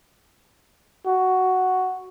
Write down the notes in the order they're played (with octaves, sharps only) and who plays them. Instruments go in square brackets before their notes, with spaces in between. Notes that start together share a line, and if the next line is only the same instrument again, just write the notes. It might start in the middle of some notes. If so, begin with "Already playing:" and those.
[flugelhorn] F#4